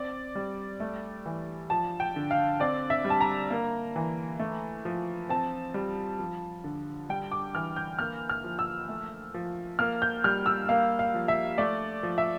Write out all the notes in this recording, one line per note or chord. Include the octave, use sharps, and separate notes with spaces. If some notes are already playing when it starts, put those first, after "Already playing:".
Already playing: C4 D5
G3
A3
E3
F3 A5
G5
D3
F5
C4 D5
E5
G3
A5
A#5
A#3
E3
A3
F3
C4 A5
G3
F3
D3
G3 G5
D6
E3 F6
G6
A#3 F6
F6
F3
E6
A3
F3
A#3 F6
G6
G3 F6
E6
A#3 F5
F5
F3
E5
A3 D5
F3
E5